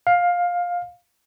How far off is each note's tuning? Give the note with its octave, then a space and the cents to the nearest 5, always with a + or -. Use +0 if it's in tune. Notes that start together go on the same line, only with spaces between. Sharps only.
F5 +15